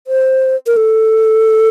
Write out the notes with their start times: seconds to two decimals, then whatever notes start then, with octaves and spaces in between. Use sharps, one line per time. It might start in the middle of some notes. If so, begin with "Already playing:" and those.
0.07 C5
0.67 A#4
0.77 A4